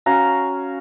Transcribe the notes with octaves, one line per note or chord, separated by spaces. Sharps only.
C#4 F#4 F5 A#5